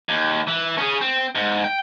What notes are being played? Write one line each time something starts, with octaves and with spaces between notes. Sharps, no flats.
D#2
E3
C#4 G#4
C4
G#2
G5